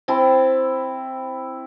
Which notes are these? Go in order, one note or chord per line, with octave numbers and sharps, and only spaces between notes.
C4 E4 A5 C6